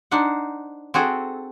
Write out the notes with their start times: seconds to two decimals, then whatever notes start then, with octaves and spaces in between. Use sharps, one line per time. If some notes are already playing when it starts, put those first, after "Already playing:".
0.11 D4 D#4 C5 F#5
0.94 C4 F#4 G#4 A4